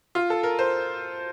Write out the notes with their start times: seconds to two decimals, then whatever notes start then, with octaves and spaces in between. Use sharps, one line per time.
0.15 F4
0.30 A4
0.43 A#4
0.59 C5